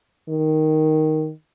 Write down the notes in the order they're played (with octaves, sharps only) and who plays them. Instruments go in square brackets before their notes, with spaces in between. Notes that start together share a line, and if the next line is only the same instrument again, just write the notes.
[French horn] D#3